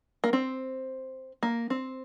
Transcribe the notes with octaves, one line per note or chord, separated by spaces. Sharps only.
A#3
C4
A#3
C4